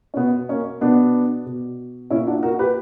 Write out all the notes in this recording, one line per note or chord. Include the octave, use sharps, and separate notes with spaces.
C#4
B2 B3
A#3 C#4
B2 B3 D4
B2
A#2 C#4 E4
D4 F#4
F#4 A#4
G4 B4